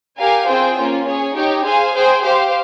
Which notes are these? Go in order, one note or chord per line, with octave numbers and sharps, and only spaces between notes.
G4 A#4 F5 G#5
C4 F4 G#4 C5 G5
A#3 C#4 F4
C#4 G#4 C#5
D#4 G4 C#5 G5
G#4 C5 F5 G#5
G#4 C5 G5
G4 C5 F5